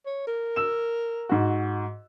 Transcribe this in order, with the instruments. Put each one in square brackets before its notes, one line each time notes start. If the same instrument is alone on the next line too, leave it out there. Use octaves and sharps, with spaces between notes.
[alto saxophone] C#5
A#4
[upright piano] E6 E7
G#2 F#4